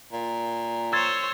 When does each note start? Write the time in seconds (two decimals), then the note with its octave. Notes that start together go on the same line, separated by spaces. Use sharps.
0.12 A#2
0.93 C5 C#5 E6 G#6 A6